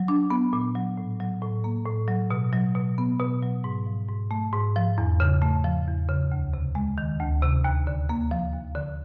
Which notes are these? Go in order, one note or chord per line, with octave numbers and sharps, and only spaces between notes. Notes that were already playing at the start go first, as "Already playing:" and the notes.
Already playing: F#3
D4
B3
A#2
F#3
A2
F#3
A2
A#3
A2
F#3
B2
F#3
B2
B3
B2
F#3
G#2
F3
G#2
A3
G#2
F3
E2
C#3
A3
F3
E2
C#3
D2
C3
G#3
D#3
D2
C3
D#2
D3
A#3
F3
D#2
D3